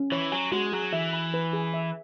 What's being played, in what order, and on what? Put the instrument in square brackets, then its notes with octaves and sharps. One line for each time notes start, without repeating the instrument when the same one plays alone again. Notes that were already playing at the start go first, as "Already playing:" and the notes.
Already playing: [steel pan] C#4
[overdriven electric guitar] E3 [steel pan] C#5
[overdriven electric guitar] F#3 [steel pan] G#5
[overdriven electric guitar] G#3 [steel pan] F#4
[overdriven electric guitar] F#3 [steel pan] G#4
[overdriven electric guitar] E3 [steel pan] E5
[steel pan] B5
B4
G#4
E5